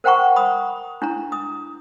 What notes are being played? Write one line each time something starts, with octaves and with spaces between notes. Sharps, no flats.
A#4 C5 F#5 G5 A#5 C#6
B5 D#6
D4 E4 A#5
D#6